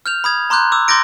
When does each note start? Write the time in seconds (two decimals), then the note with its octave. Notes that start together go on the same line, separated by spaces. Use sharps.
0.06 F6 G6 F7
0.24 B5 D#6 G#6
0.50 A#5 C6 D6 F#6 G6
0.72 D6 E6
0.88 C6 D6 G6 A6 A#6 D7